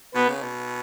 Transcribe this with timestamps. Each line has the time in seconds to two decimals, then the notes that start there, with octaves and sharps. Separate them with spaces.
0.14 B2 B3
0.28 C#3
0.42 B2